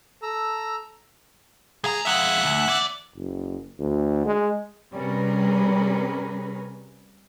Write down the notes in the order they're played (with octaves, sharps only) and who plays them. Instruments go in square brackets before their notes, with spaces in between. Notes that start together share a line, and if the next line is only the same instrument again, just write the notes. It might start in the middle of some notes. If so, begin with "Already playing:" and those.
[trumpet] A4 [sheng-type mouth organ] A#5 E6
[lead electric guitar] C#2 A#5 [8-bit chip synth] G#4
[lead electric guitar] F2 G#3 [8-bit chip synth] E5 F#5 F#6
[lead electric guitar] D2
E2 D5
[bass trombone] F#1
D2
G#3
[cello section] C3 G3 C#4 G#4 A#4 B4